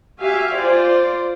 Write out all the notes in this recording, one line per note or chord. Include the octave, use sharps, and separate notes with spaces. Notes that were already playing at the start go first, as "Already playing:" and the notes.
F#4 G4 E5 F5 G#5
F4 C5 D5